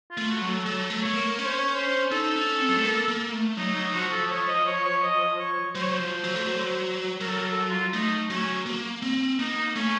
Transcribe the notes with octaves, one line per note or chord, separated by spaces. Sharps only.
F4
A3
F#4
F#3
A4
F#3 A4
A3
A3 C#5
A#3
C#4 C#5
C5
C#5
C5
D#4 A4
C#4
C4
F#3
A3
A#3
A#3
A3
F#3 D#4
D#4
F3 F#4
A4
C#5
D#5
C#5
C#5
D#5
C#5
F#3 C5
C#5
C5
F3
F#3
A3
F#3
F#3 A#4
A4
A#4
A4
F4
A3 D#4
F#3 C#4
A#3
C4
A#3 D#4
A3 C#4